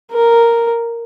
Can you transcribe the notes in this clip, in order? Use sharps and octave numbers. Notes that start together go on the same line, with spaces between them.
A#4